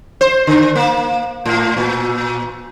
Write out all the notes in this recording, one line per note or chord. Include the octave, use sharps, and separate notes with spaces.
C5
D3
A#3
A2
A#2